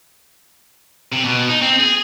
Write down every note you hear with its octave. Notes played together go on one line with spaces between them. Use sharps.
C3
B2
D#4
C4
G#4